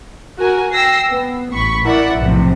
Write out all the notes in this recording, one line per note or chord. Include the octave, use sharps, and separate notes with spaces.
F#4 A#4 G#5
G5 E6 A#6 C7
B3
A1 B5 C#6
E4 A#4 D5 E5 F#5
B1 F2 A2 C3